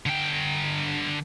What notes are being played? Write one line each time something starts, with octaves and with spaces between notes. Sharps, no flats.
D3 G5